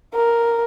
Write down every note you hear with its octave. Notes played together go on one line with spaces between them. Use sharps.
A#4